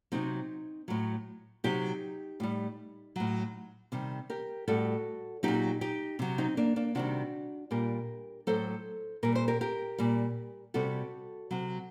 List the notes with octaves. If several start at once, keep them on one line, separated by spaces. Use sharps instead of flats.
C3 F#3 C4 D#4
A2 F#3
C3 F#3 D#4 G4
A2 G3
A2 F#3
C3 D#3 G3
G4 A#4
A2 G3 F#4 A4
A#2 F#3 D#4 G4
D#4 G4
C3 F#3
C4 D#4
A#3 D4
A#3 D4
C3 D#3 G3 D4 F#4
A#2 G3 G4 A#4
A2 F#3 A4 C5
A#2 G3 A#4
C5
G4 A#4
G4 A#4
A#2 G3
C3 G3 F#4 A4
C3 F#3